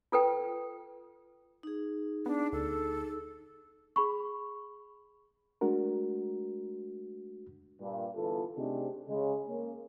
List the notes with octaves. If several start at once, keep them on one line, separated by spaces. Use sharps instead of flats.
F4 A4 B4 G5
D#4 G#4
B3 D4
D2 A4
G#4 B5 C#6
G#3 A3 D4 F#4 A#4
G2 A#2
G1 E2 B3 F4 A4
C3 A3 C4 D4 D#4 G#4
C#3 G#3
A#3 C#4